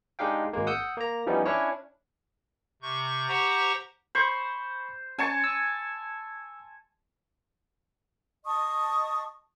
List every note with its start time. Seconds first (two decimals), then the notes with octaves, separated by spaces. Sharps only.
0.19 G#3 D4 D#4 G4 F5 G5
0.53 G#1 G#3 A#3
0.67 F#5 D#6 E6 G6
0.97 A#3 A#5
1.26 E3 F3 G3 B3 C#4 D#4
1.45 C#4 D4 E4 C#5
2.82 C3 C#6 G6
3.28 G4 C5 F#5 A#5 C#6
4.15 C5 B5 C#6 G6
5.18 C#4 G#5 A5 C#6
5.44 E6
8.45 D#5 A5 C#6 D#6